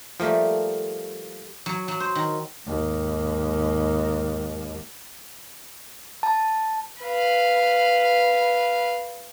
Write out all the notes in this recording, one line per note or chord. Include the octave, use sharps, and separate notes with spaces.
F3 G3 A3 A#3
F#3
F#3
C5
D#3
D#2 G#2
A5
B4 F5